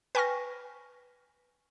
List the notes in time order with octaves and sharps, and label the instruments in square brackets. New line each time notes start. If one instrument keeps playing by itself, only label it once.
[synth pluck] B4 G5 G#5 C#6 F6 A#6